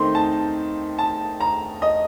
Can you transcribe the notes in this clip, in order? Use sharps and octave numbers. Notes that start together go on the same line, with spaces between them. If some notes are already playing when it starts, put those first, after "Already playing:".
Already playing: D#3 A3 C4 D#4 C6
A5
A5
A#5
D#5